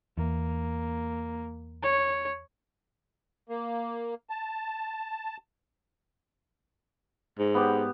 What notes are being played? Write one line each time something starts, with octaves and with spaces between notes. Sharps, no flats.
E2 A#3
C#5
A#3
A5
G#2
B3 G4